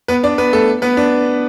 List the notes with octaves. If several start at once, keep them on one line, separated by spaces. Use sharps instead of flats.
B3 B4
D4 D5
B3 B4
A3 A4
B3 B4
D4